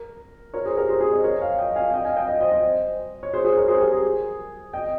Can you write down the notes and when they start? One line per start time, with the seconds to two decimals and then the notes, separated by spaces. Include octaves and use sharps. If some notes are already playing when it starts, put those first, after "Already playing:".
Already playing: A#4
0.54 A#4 C#5
0.65 G#4 C5
0.77 G4 A#4
0.89 G#4 C5
1.00 G#4 C5
1.12 C5 D#5
1.24 A#4 C#5
1.41 C#5 F5
1.58 D#5 G5
1.76 F5 G#5
1.94 D#5 G5
2.05 F5 G#5
2.16 D#5 G5
2.29 D#5 G5
2.41 C5 D#5
2.52 C5 D#5
3.23 C#5
3.33 G#4 C5
3.45 G#4 C5
3.57 A#4 C#5
3.68 G#4 C5
3.80 G4 A#4
3.92 G#4
4.73 D#5 G5